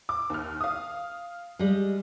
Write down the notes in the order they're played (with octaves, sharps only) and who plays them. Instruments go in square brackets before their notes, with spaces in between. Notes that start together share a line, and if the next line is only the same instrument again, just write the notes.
[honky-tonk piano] D6
D#2 F6
F5 D#6
[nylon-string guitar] G3 G#3